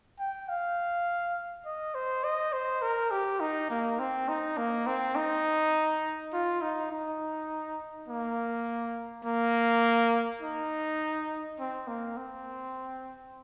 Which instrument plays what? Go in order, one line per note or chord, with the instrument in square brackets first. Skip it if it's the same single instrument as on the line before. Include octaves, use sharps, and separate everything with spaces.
[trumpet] G5
F5
D#5
C5
D#5
C5
A#4
G4
D#4
A#3
C4
D#4
A#3
C4
D#4
F4
D#4
D#4
A#3
A#3
D#4
C4
A#3
C4